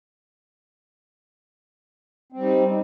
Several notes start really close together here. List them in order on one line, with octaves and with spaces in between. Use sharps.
C4 G3 D#4